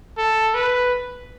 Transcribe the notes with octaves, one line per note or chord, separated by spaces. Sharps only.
A4
B4